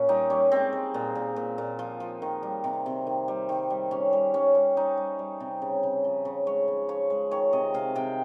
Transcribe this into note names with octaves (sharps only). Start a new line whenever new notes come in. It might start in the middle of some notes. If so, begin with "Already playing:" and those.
Already playing: A#2 C#4 F4
G3 D#4
G3 C#4
G#3 C4
G#3
A#2
A#2
A#2
A#2
F3
F3
D#3
G3
C3
C3
D#3
G3
D#3
G3
G3 C#4
G3
G3 C#4
G3
G3 D#4
G3
G3
C3
C#3
C#3
F3
C#3
G#3 C#5
C#3
F3 C#5
G#3
D#3 C#5
C3 D#5
C3 F5
C3 G5